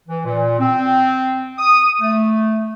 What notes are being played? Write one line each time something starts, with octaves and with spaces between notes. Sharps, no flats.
E3
A#2
C4
D#6
A3